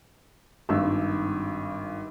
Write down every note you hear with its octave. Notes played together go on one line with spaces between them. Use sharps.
G#1 G2 E6